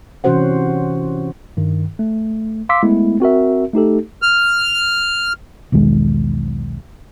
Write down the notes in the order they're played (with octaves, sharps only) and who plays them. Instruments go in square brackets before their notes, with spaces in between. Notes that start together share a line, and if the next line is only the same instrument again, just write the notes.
[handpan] C3 E3 C#4 F#4 C5 F#5
[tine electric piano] G2 D#3
A3
F5 C6 D6 E6 B6
G#3 A3 B3 E4
C4 F#4 A#4 E5
A3 D#4 G4 A4
[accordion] F6
[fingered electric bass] B1 E2 D#3 G#3